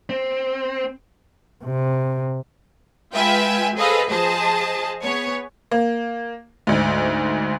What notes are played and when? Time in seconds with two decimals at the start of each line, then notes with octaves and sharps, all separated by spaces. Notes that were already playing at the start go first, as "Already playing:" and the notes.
0.09 C4
1.64 C3
3.13 G#3 F4 B4 E5 G5 G#5
3.76 G#4 A4 B4 C5 D#5 F5
4.10 F3 G#4 C5 D#5 A5
5.02 B3 G#4 C#5
5.71 A#3
6.67 D2 G#2